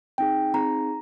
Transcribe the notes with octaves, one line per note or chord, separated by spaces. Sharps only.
C4 D#4 G#4 G5
C4 D#4 G#4 A#5